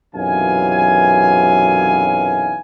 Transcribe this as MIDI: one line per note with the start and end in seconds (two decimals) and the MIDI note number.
0.14 2.58 35
0.14 2.58 42
0.14 2.58 48
0.14 2.58 52
0.14 2.58 77
0.14 2.58 80